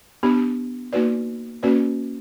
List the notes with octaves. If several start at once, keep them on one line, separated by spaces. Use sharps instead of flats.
B3 D4 G4
A#3 D#4 F#4 B4 D5
A#3 C#4 F#4 B4 D5